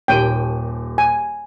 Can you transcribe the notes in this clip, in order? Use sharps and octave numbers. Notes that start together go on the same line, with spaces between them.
D#1 D#2 G5 D#7
G#5